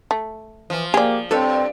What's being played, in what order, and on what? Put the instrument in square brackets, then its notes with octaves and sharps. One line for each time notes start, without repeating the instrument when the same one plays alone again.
[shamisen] A3
[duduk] E3 [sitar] F3
[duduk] A#3 [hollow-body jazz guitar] G4 [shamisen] G#4 D5
[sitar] G2 [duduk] C4 [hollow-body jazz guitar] A4 B4 C#5